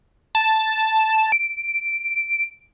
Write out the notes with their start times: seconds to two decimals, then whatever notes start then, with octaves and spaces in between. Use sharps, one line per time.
0.35 A5
1.32 D7